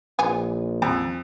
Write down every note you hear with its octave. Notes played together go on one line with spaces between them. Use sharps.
A#1 E3 G#4 G#5
F2